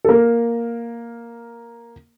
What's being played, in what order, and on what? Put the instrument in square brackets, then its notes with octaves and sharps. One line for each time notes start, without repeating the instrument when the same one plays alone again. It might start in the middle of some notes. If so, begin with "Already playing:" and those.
[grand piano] A4
A#3 A#4